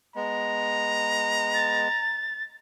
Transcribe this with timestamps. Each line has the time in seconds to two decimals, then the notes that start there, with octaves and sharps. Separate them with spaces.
0.16 G#3 B3 A#5
1.54 A6